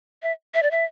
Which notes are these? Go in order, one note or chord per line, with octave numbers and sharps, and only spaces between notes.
E5
E5
D5
E5